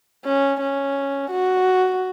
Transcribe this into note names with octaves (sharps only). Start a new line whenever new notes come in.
C#4
C#4
F#4